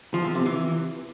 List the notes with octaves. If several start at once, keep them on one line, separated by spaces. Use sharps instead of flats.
F3
E2
C3
E3